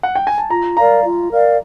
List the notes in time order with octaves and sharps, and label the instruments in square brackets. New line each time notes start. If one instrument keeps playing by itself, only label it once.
[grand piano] F#5
G5
G#5
A5
[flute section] F4 [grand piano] A#5
[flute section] A#4 D5 F5 [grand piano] A#5
[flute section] F4
A#4 D5 F5